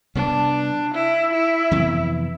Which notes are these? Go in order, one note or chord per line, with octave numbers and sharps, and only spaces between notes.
C3 G3 B3 D4
E4
E4
F2 C3 E3 B3